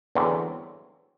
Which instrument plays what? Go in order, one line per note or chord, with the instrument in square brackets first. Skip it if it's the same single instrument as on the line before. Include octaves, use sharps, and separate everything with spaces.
[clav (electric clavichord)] E2 D3 F#3 C4